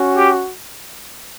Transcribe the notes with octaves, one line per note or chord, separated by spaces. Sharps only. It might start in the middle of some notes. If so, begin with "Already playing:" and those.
Already playing: C#4 F#4
G4